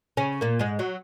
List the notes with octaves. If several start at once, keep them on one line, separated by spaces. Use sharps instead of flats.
C#3 C#4
A#2 A#3
G#2 G#3
F#3